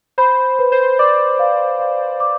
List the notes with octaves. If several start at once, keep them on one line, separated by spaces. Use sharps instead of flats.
C5 B5
B4
C5
D5 D6
F5
F5
D6